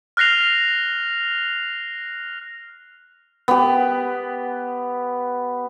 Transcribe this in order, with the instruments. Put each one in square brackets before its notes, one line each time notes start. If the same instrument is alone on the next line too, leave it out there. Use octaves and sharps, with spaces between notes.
[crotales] F6 F#6 A#6 C7 F7
[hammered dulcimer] B3 G4